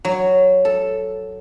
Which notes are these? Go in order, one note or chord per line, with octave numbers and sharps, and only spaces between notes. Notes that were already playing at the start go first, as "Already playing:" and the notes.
F#3
A4